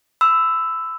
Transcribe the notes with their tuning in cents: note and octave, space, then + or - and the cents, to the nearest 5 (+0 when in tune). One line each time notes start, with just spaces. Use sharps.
B5 +40 E6 +0